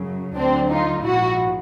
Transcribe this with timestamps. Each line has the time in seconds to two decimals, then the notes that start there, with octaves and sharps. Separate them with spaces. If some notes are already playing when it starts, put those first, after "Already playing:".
Already playing: F#2 C#3 F#3
0.36 D2 D3 F#3 C4 D4
0.71 D#4 F4
1.04 A#1 G#2 F3 E4 F#4